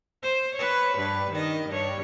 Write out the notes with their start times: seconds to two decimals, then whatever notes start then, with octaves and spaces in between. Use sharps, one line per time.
0.22 C5
0.55 B4 C#5
0.98 G2 B4
1.31 D#3 D#5
1.69 G2 C#5